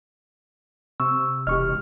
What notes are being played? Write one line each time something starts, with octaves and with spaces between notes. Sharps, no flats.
C3 C#6 E6
E1 G4 D#5 C#6 F6